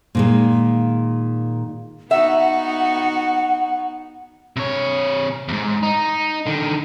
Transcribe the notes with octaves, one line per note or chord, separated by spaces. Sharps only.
A#2 D#3 G#3
B3 D#4 F#4 E5 F#5
C3 C#5
E2 G#2
D#4
D3 D#3